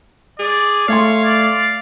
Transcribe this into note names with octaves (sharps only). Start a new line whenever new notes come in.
G#4 D5
A3 C#5 F5 C6
D5